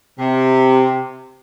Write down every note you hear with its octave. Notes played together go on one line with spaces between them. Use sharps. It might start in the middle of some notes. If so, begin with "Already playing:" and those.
C3